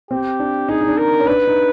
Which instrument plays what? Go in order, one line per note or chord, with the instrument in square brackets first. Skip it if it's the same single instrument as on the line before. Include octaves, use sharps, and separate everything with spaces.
[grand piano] C4 [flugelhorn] G4
[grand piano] D4
[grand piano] D#4 [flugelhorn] G#4
[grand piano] D#4
D4
[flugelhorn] A#4
[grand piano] C#4
[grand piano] D4 [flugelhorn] B4
[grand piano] D#4